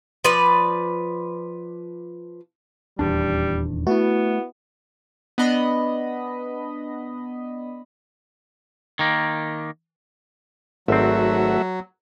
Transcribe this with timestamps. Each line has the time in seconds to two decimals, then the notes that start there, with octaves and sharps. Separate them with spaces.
0.24 F3 B4 D5
2.99 D#1 E2 G3 D4
3.87 A3 B3 E4 F#4
5.38 B3 D4 D#5 B5
8.99 D#3 A#3
10.88 G#1 F#3 A3 C4 F#4 E5